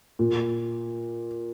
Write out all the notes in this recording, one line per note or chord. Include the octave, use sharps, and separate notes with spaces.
A#2